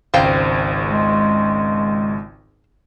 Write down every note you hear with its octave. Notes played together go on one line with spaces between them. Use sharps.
G#1 C#2 C5 F5 G5
G#3